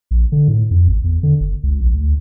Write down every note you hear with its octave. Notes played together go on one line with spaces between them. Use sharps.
A#1
D3
A2
F2
G#1
E2
D3
F#1
C#2
A#1
D2